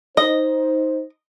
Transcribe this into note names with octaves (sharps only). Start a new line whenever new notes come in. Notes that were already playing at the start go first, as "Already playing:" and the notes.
D#4 C5 D#5